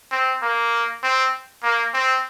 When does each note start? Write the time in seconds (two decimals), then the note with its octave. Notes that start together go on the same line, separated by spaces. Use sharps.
0.11 C4
0.42 A#3
1.03 C4
1.63 A#3
1.94 C4